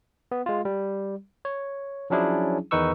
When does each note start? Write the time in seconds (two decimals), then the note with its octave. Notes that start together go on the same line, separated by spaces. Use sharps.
0.31 B3
0.46 G#3 F4
0.65 G3
1.45 C#5
2.10 F3 F#3 C#4 D4 E4 G#4
2.71 E2 D#3 D#4 B4 C#6 E6